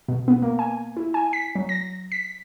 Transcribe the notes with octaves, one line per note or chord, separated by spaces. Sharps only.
B2
B3
A#3
G#5
E4
G#5
B6
F#3
A#6
B6